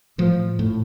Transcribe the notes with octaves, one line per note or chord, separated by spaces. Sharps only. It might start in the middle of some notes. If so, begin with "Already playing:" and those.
A2 F3
A2